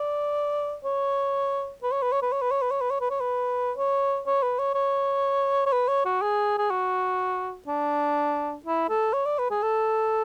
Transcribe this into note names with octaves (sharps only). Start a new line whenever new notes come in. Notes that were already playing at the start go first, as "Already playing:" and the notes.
Already playing: D5
C#5
B4
C#5
B4
C#5
B4
C#5
B4
C#5
B4
C#5
B4
C#5
B4
C#5
B4
C#5
C#5
B4
C#5
C#5
C#5
B4
C#5
F#4
G#4
G#4
F#4
D4
E4
A4
C#5
D5
B4
G#4
A4